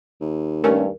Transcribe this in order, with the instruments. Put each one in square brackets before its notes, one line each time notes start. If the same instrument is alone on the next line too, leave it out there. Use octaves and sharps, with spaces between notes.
[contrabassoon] D#2
[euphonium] G2 [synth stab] A3 C#4 [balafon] A#4